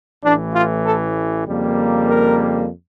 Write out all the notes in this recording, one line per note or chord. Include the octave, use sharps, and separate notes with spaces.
A1 A2 E3 D4
F4
A4
F2 C#3 G3 A#3
A#4